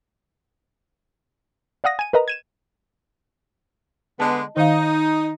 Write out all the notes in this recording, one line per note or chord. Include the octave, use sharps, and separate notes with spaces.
D5 F5 F#5 D#6 A#6
G#5 D#7
A#4 B4 D#5 A#5
G#6 D#7 E7
D3 G#3 B3 D#5 A5
D#3 D#4 F5